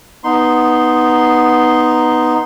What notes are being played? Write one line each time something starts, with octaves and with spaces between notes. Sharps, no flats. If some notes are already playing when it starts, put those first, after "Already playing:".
B3 D#4 C6